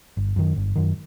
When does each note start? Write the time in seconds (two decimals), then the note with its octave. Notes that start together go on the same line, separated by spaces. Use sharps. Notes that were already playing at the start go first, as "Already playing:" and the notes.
0.17 G1
0.36 F#2 D#3
0.56 G1
0.76 F#2 D#3